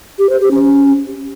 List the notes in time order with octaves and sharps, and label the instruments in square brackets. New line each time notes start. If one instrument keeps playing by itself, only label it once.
[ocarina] G4
C5
G4
C#4